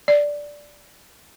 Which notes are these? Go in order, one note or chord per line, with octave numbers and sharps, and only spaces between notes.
D5